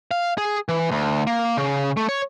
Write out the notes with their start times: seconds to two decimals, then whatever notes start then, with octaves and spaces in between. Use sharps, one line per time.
0.11 F5
0.38 G#4
0.69 E3
0.91 D2
1.27 A#3
1.58 C#3
1.97 A3
2.09 C#5